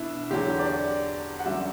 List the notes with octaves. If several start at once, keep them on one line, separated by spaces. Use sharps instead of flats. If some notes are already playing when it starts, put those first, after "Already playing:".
Already playing: B2 D4 E4
E2 D3 F#3 G4
D5
F#5
F#2 D3 G3 E5